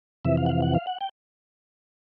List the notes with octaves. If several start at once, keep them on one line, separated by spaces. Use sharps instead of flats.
F2 C3 E3 E5
F5
F#5
F5
F#5
F5
F#5
G5